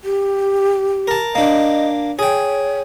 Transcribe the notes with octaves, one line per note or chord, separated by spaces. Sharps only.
G4
A#4 A5
A#3 D4 D#5
G#4 C#5 G5